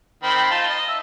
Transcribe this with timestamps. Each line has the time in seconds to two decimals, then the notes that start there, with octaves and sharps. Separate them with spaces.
0.23 D#3 C4 B5
0.51 D#4 F4 A5
0.70 D#5
0.88 E5